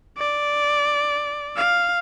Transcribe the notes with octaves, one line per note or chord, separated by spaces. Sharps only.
D5
F5